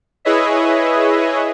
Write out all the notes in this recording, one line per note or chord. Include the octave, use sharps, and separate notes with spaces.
E4 G#4 B4 C#5 D#5 E5